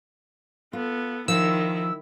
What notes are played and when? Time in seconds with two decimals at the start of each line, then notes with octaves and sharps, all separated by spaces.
0.73 B3 F4 A4
1.28 D#3 F3 E4 E6